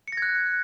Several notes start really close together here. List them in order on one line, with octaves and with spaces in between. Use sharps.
C#7 A#6 G#6 F#6